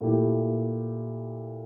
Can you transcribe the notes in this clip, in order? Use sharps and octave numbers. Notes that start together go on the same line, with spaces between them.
A#2 A3 E4 G4